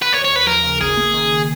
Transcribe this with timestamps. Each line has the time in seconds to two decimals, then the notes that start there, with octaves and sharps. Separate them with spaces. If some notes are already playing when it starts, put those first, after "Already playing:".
0.02 B4
0.13 D#2 C#5
0.25 C#5
0.30 D#2
0.36 B4
0.47 F3 A#4
0.64 C#3
0.81 G#1 G#4
0.97 A#3
1.14 D#3